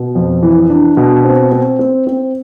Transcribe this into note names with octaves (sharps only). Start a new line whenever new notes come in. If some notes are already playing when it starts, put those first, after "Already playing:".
Already playing: B2
F2
E3
D4
B2
C4
C4
C4
C4